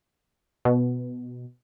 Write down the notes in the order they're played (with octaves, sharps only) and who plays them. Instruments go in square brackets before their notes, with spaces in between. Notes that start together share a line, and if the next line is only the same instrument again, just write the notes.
[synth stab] B2